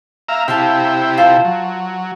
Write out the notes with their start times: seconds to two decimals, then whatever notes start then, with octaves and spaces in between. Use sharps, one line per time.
0.29 E5 F5 A#5
0.48 C3 E4 G4 E5 F5 A5
1.17 F4 C5 A5
1.45 F#3